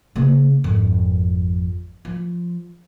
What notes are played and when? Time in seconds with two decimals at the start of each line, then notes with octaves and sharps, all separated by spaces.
0.16 C#3 A#3
0.64 G#1 F2
2.05 F3